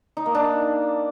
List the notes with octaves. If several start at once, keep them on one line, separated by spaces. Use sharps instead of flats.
D#4
A#3
D4